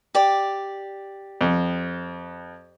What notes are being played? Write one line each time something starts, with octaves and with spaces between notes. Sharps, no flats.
G4 D5
F2